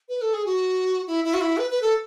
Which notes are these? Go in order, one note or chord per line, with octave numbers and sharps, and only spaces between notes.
B4
A4
G#4
F#4
E4
E4
F#4
E4
B4
B4
A4